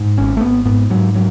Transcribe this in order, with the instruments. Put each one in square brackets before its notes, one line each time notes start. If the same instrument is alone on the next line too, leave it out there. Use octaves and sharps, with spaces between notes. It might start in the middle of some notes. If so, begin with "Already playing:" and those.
Already playing: [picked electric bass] G#2
G#1 C#4
A3
G#1 B3
G#2 B3
G#2 F#3
F#3